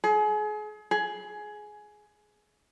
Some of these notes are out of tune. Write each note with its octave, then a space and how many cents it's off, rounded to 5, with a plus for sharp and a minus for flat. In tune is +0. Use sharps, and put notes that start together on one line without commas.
G#4 +35
G#4 +15